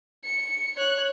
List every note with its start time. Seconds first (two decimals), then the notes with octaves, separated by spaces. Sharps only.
0.24 C#7
0.76 C#5 F#6